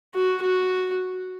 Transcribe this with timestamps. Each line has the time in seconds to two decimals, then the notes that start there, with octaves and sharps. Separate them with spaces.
0.14 F#4
0.42 F#4